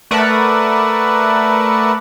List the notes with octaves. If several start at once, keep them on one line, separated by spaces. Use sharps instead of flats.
A3 A#4 B4 D5 E5 F#5